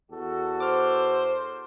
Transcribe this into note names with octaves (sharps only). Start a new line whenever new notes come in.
E2 F#4 A4
C5 D6 F6